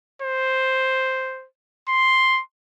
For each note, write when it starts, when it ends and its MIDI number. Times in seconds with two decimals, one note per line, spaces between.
0.22 1.46 72
1.89 2.41 84